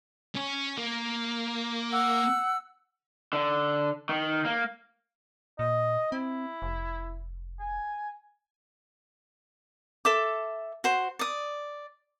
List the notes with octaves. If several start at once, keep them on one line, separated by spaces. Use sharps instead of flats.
C#4
A#3
F#5 E6
D3
D#3
A#3
A#2 D#5
C4 E4
F1
G#5
A4 E5 D6
F#4 C5
D5 D#6